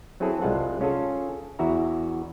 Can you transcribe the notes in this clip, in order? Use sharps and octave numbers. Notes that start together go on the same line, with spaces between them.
F#3 C4 E4 G#4 A4
C2 G3 G#3 F4 F#5 A5
C#4 F4 G#4 A4
E2 E4 F#4 E5 A#5